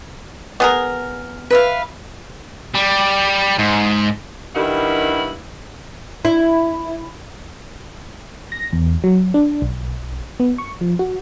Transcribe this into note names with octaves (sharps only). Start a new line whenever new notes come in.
B3 G#4 A#4
B4 E5 F5
G3
G#2
G2 D#3 E4 G4 F#5
E4
A#6
E2
F#3
D4
B1
B3
C#6
F3
F#4